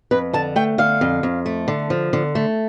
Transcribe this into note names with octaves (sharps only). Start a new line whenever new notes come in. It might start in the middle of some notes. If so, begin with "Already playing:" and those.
F2 B4
D3 A5
A3 G5
D3 F5
F2
F2
A3
D3
F3
D3
A3